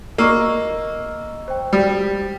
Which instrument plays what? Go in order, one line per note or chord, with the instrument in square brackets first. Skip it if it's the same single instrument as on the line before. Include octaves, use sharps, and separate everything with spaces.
[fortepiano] A#3 [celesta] D#5 C#6 E6
[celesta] C5 G5
[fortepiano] G3